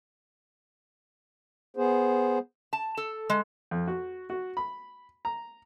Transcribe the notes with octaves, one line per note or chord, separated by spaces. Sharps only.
B3 G#4 C5
A5
A4
G#3
F2
F#4
F#4
B5
A#5